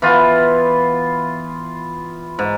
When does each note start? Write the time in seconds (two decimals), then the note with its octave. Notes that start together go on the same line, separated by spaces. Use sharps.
0.02 E3 B3 F4
2.39 G#2